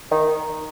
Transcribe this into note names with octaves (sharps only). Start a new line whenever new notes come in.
D#3